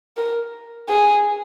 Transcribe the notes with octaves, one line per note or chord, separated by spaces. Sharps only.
A#4
G#4